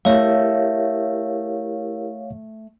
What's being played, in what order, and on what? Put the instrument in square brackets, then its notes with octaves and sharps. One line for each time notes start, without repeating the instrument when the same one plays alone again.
[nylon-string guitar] A3 E5 [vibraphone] E4 G4 A#4 [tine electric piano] C#5 F5